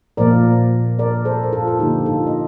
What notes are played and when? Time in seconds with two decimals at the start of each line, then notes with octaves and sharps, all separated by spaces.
0.17 A#2 F3 A#3 A#4 D5
0.99 A#4 D5
1.25 A4 C5
1.43 A#4
1.53 F4 A4
1.68 A4
1.79 D3 F3 A#3 D#4 G4
2.06 F4 A4
2.27 D#5